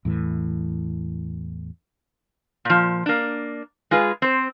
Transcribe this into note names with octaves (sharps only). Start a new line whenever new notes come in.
E2 A2 E3
A#2 F3
A#3 D4
G#3 F4 G#4 B4
C4 C5